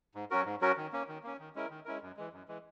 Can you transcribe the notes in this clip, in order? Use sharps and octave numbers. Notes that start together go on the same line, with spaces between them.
G#2
F#3 C#4 F#4 A#4
G#2
F#3 C#4 F#4 A#4
D#3
A#3 C#4
D#3
A#3 C#4
D#3
G#3 C#4 E4 A#4
D#3
G#3 C#4 E4 A#4
F#2
E3 G#3
F#2
E3 G#3